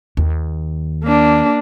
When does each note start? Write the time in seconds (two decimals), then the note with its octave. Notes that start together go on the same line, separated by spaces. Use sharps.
0.17 D#2
1.03 A#3 D4